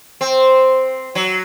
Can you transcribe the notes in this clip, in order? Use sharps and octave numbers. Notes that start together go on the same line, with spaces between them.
C4
F#3